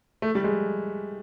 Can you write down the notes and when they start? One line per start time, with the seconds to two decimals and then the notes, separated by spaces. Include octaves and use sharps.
0.22 A3
0.35 G3
0.44 G#3